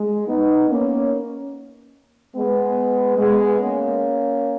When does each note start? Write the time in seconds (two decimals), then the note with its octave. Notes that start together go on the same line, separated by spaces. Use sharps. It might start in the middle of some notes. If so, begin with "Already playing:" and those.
Already playing: G#3
0.28 B3 D#4
0.69 A#3 C#4
2.35 G#3 B3
3.18 G#3 B3
3.60 A#3 C#4